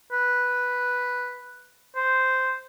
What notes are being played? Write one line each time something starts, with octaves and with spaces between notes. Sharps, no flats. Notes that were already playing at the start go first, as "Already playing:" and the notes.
B4
C5